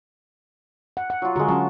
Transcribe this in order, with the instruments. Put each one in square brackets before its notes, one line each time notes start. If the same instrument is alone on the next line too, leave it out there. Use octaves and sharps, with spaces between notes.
[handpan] F#5
F#5
[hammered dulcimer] F#3 F4
[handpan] D3 F#4 [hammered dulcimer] G#3 A#4
[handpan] F#3 C#4 F#4 [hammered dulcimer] A5